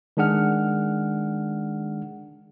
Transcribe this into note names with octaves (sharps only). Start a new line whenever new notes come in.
D#3 G#3 D4 G#4 F#5 F6